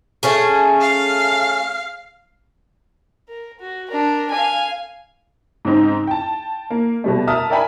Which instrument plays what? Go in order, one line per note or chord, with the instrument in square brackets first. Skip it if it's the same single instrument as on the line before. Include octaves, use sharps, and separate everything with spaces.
[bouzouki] A3 C#4 G#4
[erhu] F5
[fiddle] A#4
F#4
D4 A#4
F5 G#5
[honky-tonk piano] G#2 C#3 C4 D#4
G5 A5
A#3
B2 G3 A3
A#4 E5 A5 D#6 F6
A#4 D5 E5 G5 G#5 B5